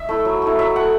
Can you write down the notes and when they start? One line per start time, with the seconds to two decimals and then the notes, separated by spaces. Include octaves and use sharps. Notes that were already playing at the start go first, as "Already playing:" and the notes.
Already playing: E5
0.09 A3 E4
0.25 F#3
0.42 A3 E4
0.59 F#3 E5
0.76 A3 E4 F#5